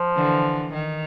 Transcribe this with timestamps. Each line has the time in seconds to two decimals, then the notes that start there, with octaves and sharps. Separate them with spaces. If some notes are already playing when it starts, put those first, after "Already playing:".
Already playing: F3
0.15 D3 E3
0.73 D#3